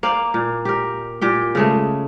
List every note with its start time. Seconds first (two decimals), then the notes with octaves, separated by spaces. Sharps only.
0.03 A#3 D5 F5 G5
0.34 A#2
0.65 G4 A#4
1.21 A#2 G4 G5
1.55 C#3 G#3 A3